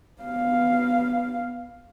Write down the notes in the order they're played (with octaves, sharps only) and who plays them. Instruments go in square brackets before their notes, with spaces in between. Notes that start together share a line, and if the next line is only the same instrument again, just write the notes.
[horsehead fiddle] B3 F5